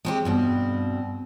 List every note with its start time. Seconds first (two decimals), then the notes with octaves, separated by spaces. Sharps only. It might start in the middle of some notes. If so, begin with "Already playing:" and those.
0.05 G#3 C4 G4
0.25 G2 B2 C4